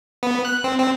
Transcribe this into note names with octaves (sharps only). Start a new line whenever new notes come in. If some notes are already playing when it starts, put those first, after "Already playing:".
B3
F#6
C4
C4